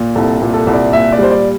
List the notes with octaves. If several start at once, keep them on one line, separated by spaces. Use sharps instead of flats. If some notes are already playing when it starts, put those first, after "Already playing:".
Already playing: A#2
C2 A4
A#2
A4
C2
D5
A#2 E5
D5
G3 C5
D5